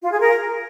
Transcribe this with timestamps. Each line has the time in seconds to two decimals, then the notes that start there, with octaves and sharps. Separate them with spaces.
0.02 F4
0.11 G#4
0.20 A#4